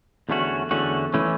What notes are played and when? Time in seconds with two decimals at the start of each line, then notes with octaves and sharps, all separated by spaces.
0.29 E2 D3 A3 C#4 F#4
0.71 E2 D3 A3 C#4 F#4
1.14 E3 A3 C#4